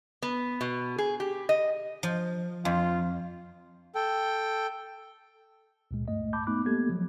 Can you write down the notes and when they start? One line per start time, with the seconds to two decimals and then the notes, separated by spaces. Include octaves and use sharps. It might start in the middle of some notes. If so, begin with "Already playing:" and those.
0.22 B3
0.61 B2
0.98 G#4
1.20 G4
1.49 D#5
2.03 F3
2.65 F2 F4
3.95 A4 G5
5.91 C#2 A#2 G#3
6.08 G2 A3 D#5
6.33 A5 B5 D6 G6
6.47 A3 B3 D#4 B5 D6 F#6
6.65 G#3 A#3 B3 G4 A4 G#6
6.89 F3 F#3 G#3